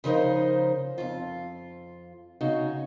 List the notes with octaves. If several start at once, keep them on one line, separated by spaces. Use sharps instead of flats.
C#3 F3 D#4 A#4 C5
F2 F4
C#3 D#4 F#4